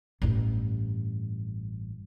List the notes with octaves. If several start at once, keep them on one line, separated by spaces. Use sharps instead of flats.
A1 G2